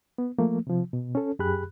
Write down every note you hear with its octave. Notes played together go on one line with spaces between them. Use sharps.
B3
F3 A3 A#3
C3 F3
B2
C#4 A4
F#2 G4 G#4 B5 F#6